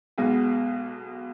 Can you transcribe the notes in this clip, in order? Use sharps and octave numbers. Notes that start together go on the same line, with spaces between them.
B1 B2 G#3 B3